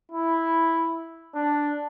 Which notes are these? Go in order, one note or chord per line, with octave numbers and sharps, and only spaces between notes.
E4
D4